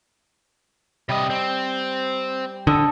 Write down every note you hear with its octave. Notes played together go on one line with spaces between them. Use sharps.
C3 G3 D#5
C4
D3 A4 D#5